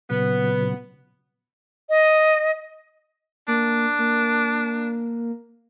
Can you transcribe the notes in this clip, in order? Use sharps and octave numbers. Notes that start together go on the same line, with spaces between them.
A#2 C#3 F#3 B3
D#5
A#3 D4
A#3